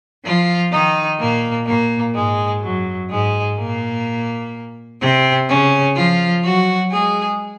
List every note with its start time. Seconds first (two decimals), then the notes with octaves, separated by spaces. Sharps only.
0.24 F3 F4
0.72 D#3 D#4
1.20 A#2 A#3
1.67 A#2 A#3
2.15 G#2 G#3
2.62 F#2 F#3
3.10 G#2 G#3
3.58 A#2 A#3
5.01 C3 C4
5.49 C#3 C#4
5.96 F3 F4
6.43 F#3 F#4
6.91 G#3 G#4